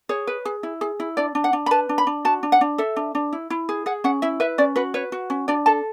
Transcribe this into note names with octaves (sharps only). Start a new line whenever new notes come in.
G#4 C#5
B4
G#4
E4
G#4
E4
D4 D5
D4
F#5
D4
B5
B4 A5
D4
B5
D4
F#4 A5
D4
F#5
D4
A4 E5
D4
D4
E4
E4
G#4
G#4 F#5
C#4 F#5
E4 E5
B4 E5
C#4 D5
F#4 B4
B4 C#5
F#4
C#4
D4 D5
A4 A5